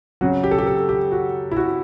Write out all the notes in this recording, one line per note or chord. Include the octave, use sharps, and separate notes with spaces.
C#3 F#3 F#4
G4
A4
G4
A4
G4
F#4
E4
F#4